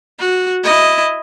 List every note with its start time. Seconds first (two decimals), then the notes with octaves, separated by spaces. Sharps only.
0.19 F#4
0.64 E4 D#5